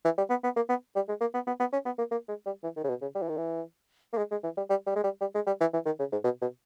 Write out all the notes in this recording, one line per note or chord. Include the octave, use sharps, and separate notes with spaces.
E3
G3
B3
B3
A#3
B3
G3
G#3
A#3
B3
B3
B3
C#4
B3
A#3
A#3
G#3
G3
E3
D#3
C#3
B2
C#3
G3
E3
D#3
E3
A#3
G#3
G#3
E3
G3
G3
G3
G#3
G3
G3
G#3
G3
E3
E3
D#3
C#3
G#2
B2
B2